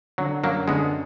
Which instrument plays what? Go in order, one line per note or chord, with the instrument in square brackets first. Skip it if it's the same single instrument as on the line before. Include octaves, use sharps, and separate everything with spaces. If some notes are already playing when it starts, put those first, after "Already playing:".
[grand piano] D3 [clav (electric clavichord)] F#3
[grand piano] F#2 [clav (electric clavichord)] F#3 A#3
[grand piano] D3 [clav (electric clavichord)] G#3 B3